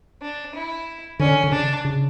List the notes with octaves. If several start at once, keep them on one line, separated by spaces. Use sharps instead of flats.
D4
E4
D3 C#4
D3
C#3 D4
C#3